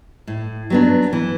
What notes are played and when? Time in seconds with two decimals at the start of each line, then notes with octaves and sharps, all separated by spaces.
0.27 A2
0.70 F#3 B3 D4
1.13 E3